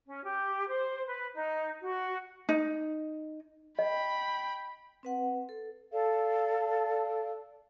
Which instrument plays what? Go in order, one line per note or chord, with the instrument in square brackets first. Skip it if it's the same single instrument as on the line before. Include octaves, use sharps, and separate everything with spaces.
[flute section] C#4
G4
C5
B4
D#4
F#4
[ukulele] D#4
[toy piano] D#5 [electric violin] G5 B5
[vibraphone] C4 B4 F#5
A4
[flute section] A4 D5 F5